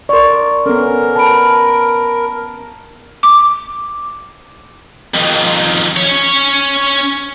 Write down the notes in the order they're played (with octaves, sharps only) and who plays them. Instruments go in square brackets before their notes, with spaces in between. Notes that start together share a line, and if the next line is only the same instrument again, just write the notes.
[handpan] A#4 D5 [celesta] C6 C#6
[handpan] B3 C#4 [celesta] A4 [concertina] A#4
[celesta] A5 B5 D7
[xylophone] D6
[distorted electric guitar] F2 D#3
C#4 C#5